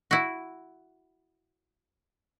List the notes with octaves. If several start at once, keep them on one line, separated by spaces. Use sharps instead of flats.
E4 F#4